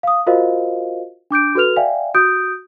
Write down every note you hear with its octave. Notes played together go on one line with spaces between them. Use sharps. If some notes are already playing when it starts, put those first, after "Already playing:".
F5 D#6
F4 F#4 A#4 C5 D#5 F5
D4 D6 G6 D7
F#4 A4 B4 F6 F7
D5 E5 F5 G5 G#5
F#4 D#6 G6 D7